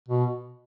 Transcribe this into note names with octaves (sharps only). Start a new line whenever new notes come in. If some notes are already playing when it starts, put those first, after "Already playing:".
B2